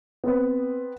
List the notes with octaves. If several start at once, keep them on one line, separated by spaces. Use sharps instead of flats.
B3 C4 B4